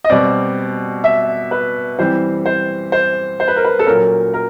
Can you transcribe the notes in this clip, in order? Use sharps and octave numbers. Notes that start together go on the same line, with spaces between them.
D#5
B2 G3 C4 D5
E5
B4
E3 G3 C4 C5
C5
C5
C5
B4
A#4
B4
A4
A#2 F#3 A#3 C#4 A#4
A#4